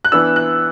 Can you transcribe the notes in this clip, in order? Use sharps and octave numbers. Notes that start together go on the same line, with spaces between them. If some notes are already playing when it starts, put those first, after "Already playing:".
F#6
E3 B3 D4 E6
F#6